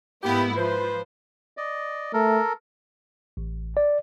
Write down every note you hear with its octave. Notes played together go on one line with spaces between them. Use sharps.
G#2 A#3 B3 E4 G4
F3 B4 C5
D5 D#5
A3 A4 A#4
A1
D5